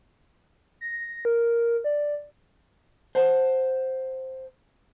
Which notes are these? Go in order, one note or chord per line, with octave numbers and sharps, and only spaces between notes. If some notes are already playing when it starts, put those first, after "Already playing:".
A#6
A#4
D5
C5 F#5 A5